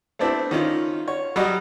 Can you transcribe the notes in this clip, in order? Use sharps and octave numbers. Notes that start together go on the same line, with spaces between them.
A3 B3 C4 D4 E4
D#3 C#4 F4
C#5
F#3 G3 F#4 D5 D#5